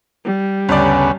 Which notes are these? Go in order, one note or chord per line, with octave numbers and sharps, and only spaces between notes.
G3
G1 D2 C#3 B3 C#4 D5